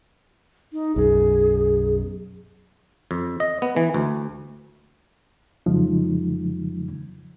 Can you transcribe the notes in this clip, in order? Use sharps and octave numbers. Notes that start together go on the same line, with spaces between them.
D#4
B1 F#2 G#4
F2
D#5
B3
E3
D2
F2 C#3 F3 F#3 G#3 D#4